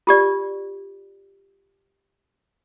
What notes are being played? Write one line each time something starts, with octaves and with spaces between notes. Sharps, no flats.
F4 G4 D5